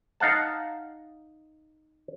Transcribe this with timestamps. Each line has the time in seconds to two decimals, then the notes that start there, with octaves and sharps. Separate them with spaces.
0.20 D#4 F5 F#5 A5